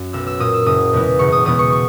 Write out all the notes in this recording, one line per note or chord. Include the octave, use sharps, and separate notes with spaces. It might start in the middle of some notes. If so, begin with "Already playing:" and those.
Already playing: F#2
B1 E6
E6
A#2 A#3 D#6
E6
F#1 D#6
E2 B2 G#3 B3
F#1 C#6
D#6
E2 B2 G#3 B3 D#6
C#6
C#6